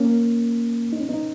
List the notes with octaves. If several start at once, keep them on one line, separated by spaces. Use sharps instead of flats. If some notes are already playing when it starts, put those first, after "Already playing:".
Already playing: A#3 C#4
D#4
C#4
B3 D#4